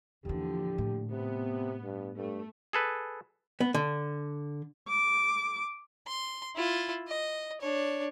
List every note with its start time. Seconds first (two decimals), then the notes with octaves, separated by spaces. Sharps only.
0.25 E2 A#2 D3 E3 F3 G4
0.78 A2
1.11 C3 B3
1.83 G2
2.17 G2 A3
2.73 G#4 A4 B4
3.61 B3
3.74 D3
4.89 D6
6.07 C6
6.55 E4 F4
7.07 D#5
7.60 D4 C#5